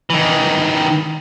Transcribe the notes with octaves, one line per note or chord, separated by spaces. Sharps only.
D#3 E3